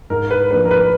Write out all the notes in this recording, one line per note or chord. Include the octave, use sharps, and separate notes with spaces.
G#2 A#4
B4
F3 A#3 D4 B4
A#4
B4